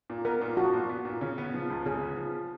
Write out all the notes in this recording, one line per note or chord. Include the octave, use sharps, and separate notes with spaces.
A#2
B3 A#4
A#2
F3 F#4
A#2
B3
A#2
C#3
B3
F3
C#2
C#3 G#4
B3
F3